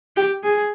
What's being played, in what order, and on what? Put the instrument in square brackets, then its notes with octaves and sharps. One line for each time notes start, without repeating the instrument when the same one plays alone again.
[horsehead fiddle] G4
G#4